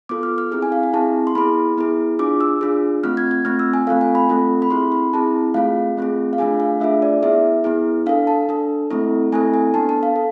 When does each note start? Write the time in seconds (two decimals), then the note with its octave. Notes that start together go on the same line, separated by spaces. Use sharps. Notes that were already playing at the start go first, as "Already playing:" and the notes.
0.09 B3 F4 A4 D6
0.23 F6
0.38 F6
0.51 C4 E4 G#4 F6
0.62 G#5
0.72 F5
0.83 G#5
0.93 C4 E4 G#4 A5
1.27 C6
1.35 B3 E4 G#4 B5
1.78 B3 E4 G#4
2.19 D4 F4 G#4 D6
2.41 E6
2.61 D4 F4 G#4
3.03 A3 C4 F4 F6
3.17 G#6
3.31 G#6
3.45 A3 C4 F4 F6
3.59 E6
3.74 G#5
3.87 A3 C4 F4 A4 F5
4.01 G#5
4.15 B5
4.29 A3 C4 F4 A4
4.62 B5
4.70 C4 E4 G#4 C6
4.92 B5
5.13 C4 E4 G#4 A5
5.54 A3 C4 F4 G#4 F5
5.97 A3 C4 F4 G#4
6.33 F5
6.38 A3 D4 F4 G#4 G#5
6.60 F5
6.80 A3 D4 F4 G#4 E5
7.02 D5
7.23 B3 E4 G#4 E5
7.64 B3 E4 G#4
8.06 D4 A4 F5
8.27 A5
8.49 D4 A4
8.90 A3 C4 E4 A4
9.32 A3 C4 E4 A4 G#5
9.54 G#5
9.74 B3 D4 A4 A5
9.89 A5
10.03 F5
10.16 A4